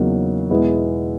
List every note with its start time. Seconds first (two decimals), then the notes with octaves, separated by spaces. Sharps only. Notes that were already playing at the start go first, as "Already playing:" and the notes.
Already playing: E2 C#3 F#3 A#3 D#4
0.50 E2 B2 G#3 B3 E4